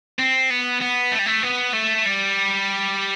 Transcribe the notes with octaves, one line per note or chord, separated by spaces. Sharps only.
C4
B3
B3
A3
G3
A3
B3
A3
G3